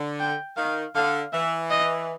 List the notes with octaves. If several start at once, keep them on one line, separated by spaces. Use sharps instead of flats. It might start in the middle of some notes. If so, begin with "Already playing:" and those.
Already playing: D3
G5
D#3 F5
D3 F5
E3 E5
D#5